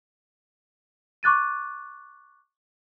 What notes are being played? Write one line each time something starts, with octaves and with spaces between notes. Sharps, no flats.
C#6 D6 F#6 A6 D#7